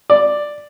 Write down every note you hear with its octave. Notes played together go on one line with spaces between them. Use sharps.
D5